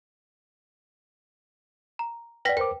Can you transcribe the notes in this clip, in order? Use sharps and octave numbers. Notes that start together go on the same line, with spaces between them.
A#5
B4 D5 F#5 G5 A#6 B6
A#4 C5 G5 D6